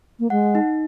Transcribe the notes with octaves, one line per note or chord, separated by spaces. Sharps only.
A#3
G#3 F#5
D#4